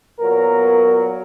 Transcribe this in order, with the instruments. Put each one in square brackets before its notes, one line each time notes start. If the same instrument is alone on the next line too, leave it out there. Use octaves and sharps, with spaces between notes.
[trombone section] A#2 F#3 B3 A#4